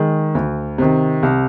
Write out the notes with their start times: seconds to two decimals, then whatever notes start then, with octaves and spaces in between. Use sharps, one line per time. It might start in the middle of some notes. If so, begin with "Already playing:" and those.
Already playing: D#3 G#3
0.35 D2
0.78 C3 D#3
1.23 C2